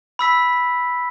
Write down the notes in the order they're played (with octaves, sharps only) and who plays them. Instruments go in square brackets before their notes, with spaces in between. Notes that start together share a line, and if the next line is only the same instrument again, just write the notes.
[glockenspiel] B5 E6 B6